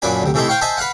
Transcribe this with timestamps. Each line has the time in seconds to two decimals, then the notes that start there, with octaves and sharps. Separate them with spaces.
0.02 F#2 A#2 D4 B4 G#5
0.22 D2 C3
0.34 C3 E3 A3 D#4 E4 C6
0.48 C5 F5 G5 C#6
0.61 C5 D#5 E5 G#5 A5
0.77 B4 F5 F#5